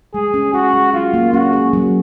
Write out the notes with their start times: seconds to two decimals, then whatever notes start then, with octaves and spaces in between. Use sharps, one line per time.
0.14 G#3 G#4
0.34 C#4
0.54 F#4 G#4
0.74 G#3
0.93 F#3 F4
1.14 A#3
1.33 C#4 F#4
1.53 G#4
1.73 F#3